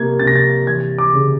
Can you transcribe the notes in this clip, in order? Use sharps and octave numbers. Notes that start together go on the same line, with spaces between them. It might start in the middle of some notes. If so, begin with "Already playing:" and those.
Already playing: C3 A#3 G#6
C3 A6
A#6
A6
E3 G#6
D6
C#3